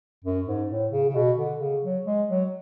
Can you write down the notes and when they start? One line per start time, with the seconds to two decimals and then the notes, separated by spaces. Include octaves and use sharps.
0.24 F#2
0.46 G#2
0.70 A2
0.92 C#3
1.09 C#3
1.16 B2
1.38 D3
1.60 C#3
1.84 F#3
2.06 G#3
2.29 F#3